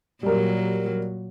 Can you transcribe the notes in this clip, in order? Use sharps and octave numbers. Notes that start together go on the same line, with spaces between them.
A#2 F#3 G3 A#4